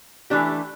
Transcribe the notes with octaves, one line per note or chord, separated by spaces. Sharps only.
E3 A3 D4 G4